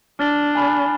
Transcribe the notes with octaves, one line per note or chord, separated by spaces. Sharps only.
D4 F6 A6 G7
G#5 B5 F6